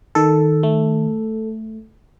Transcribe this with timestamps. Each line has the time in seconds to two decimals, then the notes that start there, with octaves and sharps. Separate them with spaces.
0.15 D#3 A4
0.63 A3